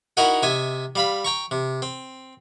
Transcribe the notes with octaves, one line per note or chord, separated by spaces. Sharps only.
D#4 E4 F#4 A#4 D#5 F#5
C3 D#5 E5 G#5
G3 F5 B5
G5 A#5 C#6
C3
C4